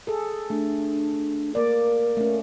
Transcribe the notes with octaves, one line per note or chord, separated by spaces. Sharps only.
G#4 A4
A3 D4
A#3 A#4 D5
A3 C#4